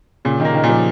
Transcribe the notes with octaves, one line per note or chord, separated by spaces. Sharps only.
A#2 C#3
D#3 A#3
D#3
A#2
F3